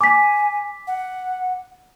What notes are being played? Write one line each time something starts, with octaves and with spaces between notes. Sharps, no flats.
G#5 D6 B6
F#5